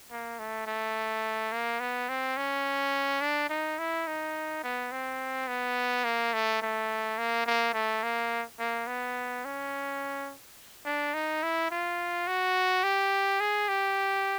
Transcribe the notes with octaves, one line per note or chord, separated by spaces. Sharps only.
A#3
A3
A3
A#3
B3
C4
C#4
D4
D#4
E4
D#4
B3
C4
B3
A#3
A3
A3
A#3
A#3
A3
A#3
A#3
B3
C#4
D4
D#4
E4
F4
F#4
G4
G#4
G4